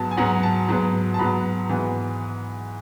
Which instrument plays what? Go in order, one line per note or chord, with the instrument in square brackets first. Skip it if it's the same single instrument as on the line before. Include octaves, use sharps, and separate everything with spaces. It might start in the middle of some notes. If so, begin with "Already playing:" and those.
Already playing: [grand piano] G#2 F#3 B3 A5
G#5
G#2 F#3 B3 F#5
A5
G#2 F#3 B3
A5
G#2 F#3 B3 B5
G#2 E3 B3